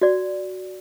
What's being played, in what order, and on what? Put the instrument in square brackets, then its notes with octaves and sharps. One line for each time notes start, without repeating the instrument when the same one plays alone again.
[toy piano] F#4 D5